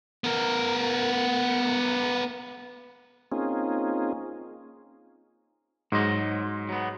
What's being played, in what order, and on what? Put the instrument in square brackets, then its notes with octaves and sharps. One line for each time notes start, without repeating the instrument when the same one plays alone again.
[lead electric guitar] B3 A#4
[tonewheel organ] A#3 C4 C#4 D#4 F4 G#4
[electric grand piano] G#2 [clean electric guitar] F#3 C5 D#5
[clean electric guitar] F#3 B3